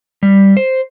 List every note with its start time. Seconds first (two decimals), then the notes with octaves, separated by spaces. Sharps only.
0.23 G3
0.57 C5